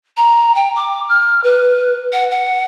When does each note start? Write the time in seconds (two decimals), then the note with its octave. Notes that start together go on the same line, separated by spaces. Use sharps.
0.17 A#5
0.55 G5
0.76 D6
1.09 F6
1.43 B4
2.13 F#5
2.31 F#5